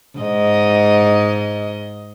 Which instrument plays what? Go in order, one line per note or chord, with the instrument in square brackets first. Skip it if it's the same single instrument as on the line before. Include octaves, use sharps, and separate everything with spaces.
[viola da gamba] G#2 D#5